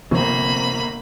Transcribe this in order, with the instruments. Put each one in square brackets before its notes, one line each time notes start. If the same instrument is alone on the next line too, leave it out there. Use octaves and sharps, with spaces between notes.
[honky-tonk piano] G1 [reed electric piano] C3 [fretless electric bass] F3 C4 [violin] A#3 B5